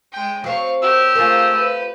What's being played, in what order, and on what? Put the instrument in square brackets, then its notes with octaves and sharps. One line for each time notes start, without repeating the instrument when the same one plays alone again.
[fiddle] G#3 G5
[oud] F#3 C4 [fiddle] F5 C#6
[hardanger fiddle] G4 C5 [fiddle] A#4 [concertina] E6
[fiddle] A3 G#4 [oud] F4 A#4
[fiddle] B4